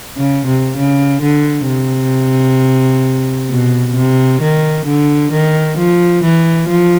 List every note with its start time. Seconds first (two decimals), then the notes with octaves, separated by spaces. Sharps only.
0.17 C#3
0.47 C3
0.77 C#3
1.22 D3
1.68 C3
3.50 B2
3.96 C3
4.41 D#3
4.86 D3
5.32 D#3
5.77 F3
6.24 E3
6.69 F3